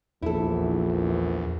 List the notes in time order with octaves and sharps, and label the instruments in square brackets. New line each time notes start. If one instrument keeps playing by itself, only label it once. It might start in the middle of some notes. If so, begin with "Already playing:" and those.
[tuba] A#1 [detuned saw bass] E2 [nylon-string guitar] E4 A4